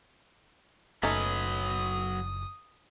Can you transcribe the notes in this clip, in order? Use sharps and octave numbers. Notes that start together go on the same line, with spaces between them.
F#1 F#3 A3 C#4 D#4 B4 D#6